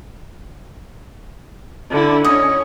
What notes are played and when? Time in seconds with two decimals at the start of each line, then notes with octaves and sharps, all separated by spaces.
1.91 D3 E4
2.24 C#4 C#5 D#5